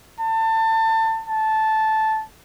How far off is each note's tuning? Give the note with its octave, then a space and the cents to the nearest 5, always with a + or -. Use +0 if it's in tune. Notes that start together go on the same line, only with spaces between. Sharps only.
A5 +25
A5 -10